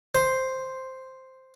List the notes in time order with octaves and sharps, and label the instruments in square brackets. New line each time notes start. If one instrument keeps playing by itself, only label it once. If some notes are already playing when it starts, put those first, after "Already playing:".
[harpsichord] C5